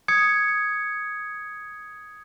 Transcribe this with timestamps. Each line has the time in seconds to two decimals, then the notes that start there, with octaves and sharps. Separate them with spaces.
0.08 D#6 G#6 C#7